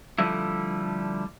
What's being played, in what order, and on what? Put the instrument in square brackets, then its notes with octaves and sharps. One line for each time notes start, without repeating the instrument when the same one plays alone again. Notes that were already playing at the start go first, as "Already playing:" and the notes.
[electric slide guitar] D3 F3 G3 A3 E4